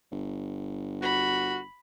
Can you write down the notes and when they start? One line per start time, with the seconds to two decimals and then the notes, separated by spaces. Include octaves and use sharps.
0.12 G1
1.02 F#4 B5